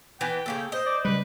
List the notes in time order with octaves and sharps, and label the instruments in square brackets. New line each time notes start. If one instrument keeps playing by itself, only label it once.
[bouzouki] E3 B3 [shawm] G5
[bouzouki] C#3 E3 A4 [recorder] A#3
[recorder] C5 [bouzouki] D#5
[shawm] D5
[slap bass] C#3 G3 [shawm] B4